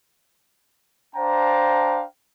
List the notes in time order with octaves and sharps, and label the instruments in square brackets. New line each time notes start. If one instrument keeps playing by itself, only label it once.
[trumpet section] D4 C5 F5 G5 A5 A#5